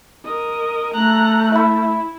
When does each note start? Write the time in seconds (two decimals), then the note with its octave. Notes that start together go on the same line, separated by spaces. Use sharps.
0.25 A#4 D#5
0.94 A3 A#5 F#6
1.52 E4 E5 B5